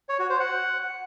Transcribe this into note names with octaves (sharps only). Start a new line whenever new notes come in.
C#5
F#4
C5
F#5